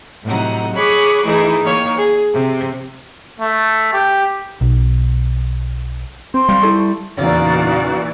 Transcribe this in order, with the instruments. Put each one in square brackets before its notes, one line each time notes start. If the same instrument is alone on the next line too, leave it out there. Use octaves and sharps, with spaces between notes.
[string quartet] A2 C3 F#3 D#4 F#5
G#4 C#5 B5 C#6 D6 F#6
E3 A3 D#4 E4 G#4
D#3 A#3 C#5
G#4
C3
[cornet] A3
G4
[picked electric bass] B1
[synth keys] C4 [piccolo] C6
[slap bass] G3 [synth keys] F5
[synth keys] E4 A4 C#6
[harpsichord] E2 C#3 [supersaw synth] A#2 E3 [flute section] D#4 F#4 F5 [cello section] D5